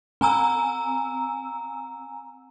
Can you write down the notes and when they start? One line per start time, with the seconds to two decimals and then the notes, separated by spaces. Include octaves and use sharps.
0.21 C4 G#5 A#5 E6